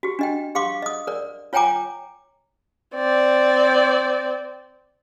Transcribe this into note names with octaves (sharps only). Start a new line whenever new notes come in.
F#4 G4
D4 D#5 G5
G4 F5 C6 D6
D#5 D#6
A#4 D5
F4 C#5 G5 G#5 A#5 D6
C4 D5